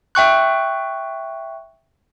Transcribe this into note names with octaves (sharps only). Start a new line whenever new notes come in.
E5 G5 C#6 F#6